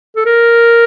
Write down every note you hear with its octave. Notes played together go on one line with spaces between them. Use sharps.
A4
A#4